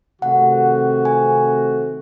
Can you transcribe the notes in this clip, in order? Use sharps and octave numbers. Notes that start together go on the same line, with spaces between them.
C3 D#3 A3 C4 F#4 F#5
G#5